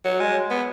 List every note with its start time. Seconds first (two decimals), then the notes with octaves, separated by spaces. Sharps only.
0.05 F#3
0.20 G#3
0.51 B3